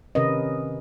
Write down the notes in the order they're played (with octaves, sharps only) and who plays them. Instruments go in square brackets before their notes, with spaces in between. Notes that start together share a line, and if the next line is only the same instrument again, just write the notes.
[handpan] C3 D#3 C#4 A#4 B4 D#5